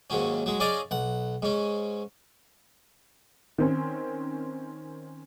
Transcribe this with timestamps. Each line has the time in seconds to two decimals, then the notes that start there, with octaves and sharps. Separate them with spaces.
0.10 D#2 G#2 F#3 C#4
0.46 F#3 G#3
0.60 C#4 G#4 D5 D#5 F5
0.91 B1 F#5
1.42 G#2 C#4
3.58 D#3 C4 C#4